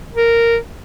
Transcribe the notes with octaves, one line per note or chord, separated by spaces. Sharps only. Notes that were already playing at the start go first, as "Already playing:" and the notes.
A#4